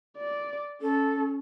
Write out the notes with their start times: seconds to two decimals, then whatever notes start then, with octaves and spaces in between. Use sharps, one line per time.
0.18 D5
0.82 C#4 A4